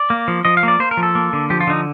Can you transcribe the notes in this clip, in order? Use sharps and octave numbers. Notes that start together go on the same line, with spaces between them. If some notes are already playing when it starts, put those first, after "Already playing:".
Already playing: D5
A#3
F3
F3 D#5
F5
A#3 D5
A#3 C5
A#4
F3
A4
A#3
D3
F3 G4
F4
D3 D#4